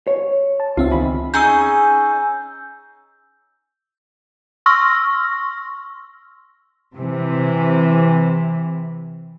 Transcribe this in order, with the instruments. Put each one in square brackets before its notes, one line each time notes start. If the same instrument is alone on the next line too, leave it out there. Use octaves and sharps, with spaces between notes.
[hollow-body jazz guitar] C#5
[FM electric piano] A5
[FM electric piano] C#2 C4 E5 [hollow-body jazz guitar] F4
[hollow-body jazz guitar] E2 D#3 B5
[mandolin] C#4 D#4 G#4 [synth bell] E6 G6
[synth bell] C6 C#6 E6 F6 A#6
[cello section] C3 E3